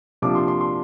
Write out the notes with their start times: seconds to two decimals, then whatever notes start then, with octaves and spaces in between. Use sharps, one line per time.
0.22 C3 F3 A#3 D4 D6
0.35 C6
0.48 C6
0.61 C6